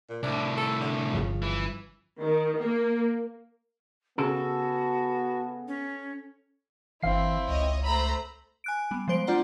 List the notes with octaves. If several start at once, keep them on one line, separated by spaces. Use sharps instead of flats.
A#2
C2 A2 D4
A4
D3
G1 G2 C#3 F3
E3
D#3
A#3
C#3 B3 F#4 A4
C#4
G1 E3 C4 E4 F5 C7
C#2 C#5 D#5
A3 C5 A#5 B5 E6
G#5 F#6 D7
G3 B3
F3 G#3 C5 D7
C4 D4 F4 D5 F#5 A#5